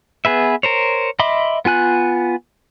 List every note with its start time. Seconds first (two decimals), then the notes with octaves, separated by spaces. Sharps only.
0.25 B3 G#4 B4 E5
0.63 A#4 C5 C#5
1.19 D#5 E5 B5 C6 D6
1.65 B3 F4 G#5 F#6